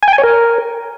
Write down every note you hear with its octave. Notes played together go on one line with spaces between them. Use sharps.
G#5
G5
G#5
C#5
A#4